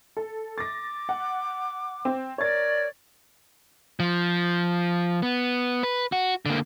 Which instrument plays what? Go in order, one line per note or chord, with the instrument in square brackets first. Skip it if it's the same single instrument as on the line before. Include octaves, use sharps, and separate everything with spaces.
[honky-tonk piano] A4
[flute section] D6 [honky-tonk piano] A6 A#6
[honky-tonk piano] F#5
C4
[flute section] A#4 D5 G#6 [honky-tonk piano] C#5 A6
[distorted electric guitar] F3
B3
B4
F#4
D3 A#3